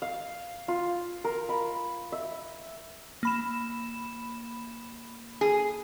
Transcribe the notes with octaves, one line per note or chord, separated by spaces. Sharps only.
F5
F4
A#4
B5
E5
A#3 B5 E7
G#4